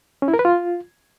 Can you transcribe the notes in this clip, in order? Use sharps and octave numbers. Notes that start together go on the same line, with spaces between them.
C#4
E4
A#4
B4
F4